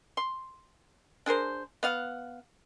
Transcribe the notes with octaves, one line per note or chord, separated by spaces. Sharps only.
C6
D4 G#4 A#4 C5
B3 F5 F#5